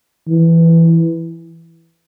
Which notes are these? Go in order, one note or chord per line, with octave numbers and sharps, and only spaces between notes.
E3